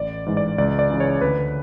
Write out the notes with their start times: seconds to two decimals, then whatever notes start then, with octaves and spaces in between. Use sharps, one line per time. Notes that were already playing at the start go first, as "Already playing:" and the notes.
Already playing: A1 D5
0.26 G#2 E3
0.37 D5
0.58 C#2 D5
0.79 D5
0.90 C#3 E3
1.00 C#5
1.21 D2 B4